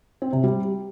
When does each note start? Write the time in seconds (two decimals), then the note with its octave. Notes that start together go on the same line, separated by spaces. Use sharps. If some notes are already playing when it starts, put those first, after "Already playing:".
0.22 C4
0.33 C3
0.43 G3